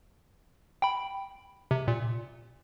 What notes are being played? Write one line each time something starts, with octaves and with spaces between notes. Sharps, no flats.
G5 B5
C3
A#2